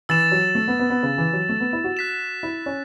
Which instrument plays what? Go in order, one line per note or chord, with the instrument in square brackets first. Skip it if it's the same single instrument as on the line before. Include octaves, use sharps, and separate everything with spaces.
[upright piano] E3 [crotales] E6 A6 E7
[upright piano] F#3
A3
B3
B3
B3
C#3
E3
F#3
A3
B3
E4
F#4
[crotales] F#6 B6 E7
[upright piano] E4
C#4